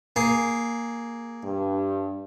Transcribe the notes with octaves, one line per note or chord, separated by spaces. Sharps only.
A#3 G#4
G2